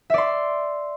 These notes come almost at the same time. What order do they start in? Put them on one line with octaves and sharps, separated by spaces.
E5 D5 C6